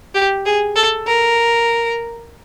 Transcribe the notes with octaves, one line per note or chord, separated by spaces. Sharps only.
G4
G#4
A4
A#4